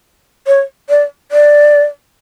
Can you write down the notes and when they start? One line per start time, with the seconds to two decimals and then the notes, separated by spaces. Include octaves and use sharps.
0.47 C#5
0.90 D5
1.32 D5